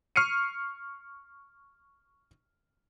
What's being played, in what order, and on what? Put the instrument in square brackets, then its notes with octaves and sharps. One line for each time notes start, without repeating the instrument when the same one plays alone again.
[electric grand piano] C#6 F6 C7 C#7 D#7